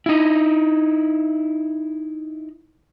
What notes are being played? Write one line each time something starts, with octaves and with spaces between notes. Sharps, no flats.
D#4 E4